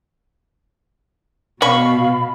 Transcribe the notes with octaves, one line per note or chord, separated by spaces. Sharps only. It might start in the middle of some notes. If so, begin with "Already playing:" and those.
B2 F5 B5 C#6